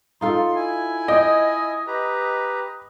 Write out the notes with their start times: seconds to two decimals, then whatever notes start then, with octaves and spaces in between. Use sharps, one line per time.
0.21 D#4 F4 A4 C6
0.55 E4 G#5
1.08 D#5 G5
1.87 G4 B4 A#5